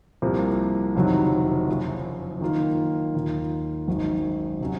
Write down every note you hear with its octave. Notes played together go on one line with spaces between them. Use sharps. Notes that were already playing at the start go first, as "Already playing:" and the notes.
C2 C3 F3 A#3
F#1 F2 C3 D#3 F#3
F#1 F#2 F3
D#3 A#3 F4
D#2 D#3 A#3 F4
G#1 F#2 D#3
C3 F#3 C#4